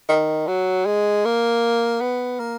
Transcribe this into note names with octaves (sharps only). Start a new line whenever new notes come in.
D#3
F#3
G#3
A#3
B3
A#3